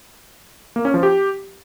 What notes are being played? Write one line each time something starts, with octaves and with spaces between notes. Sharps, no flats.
A#3
C#4
F3
G4